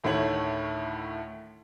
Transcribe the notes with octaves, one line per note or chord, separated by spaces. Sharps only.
D2 A2 D#3 A3 C#5 F#7